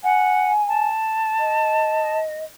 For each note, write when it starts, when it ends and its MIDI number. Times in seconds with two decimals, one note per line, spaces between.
0.04 0.52 78
0.04 0.88 80
0.68 2.19 81
1.40 2.44 75